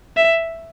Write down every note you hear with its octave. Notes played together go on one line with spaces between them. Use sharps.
E5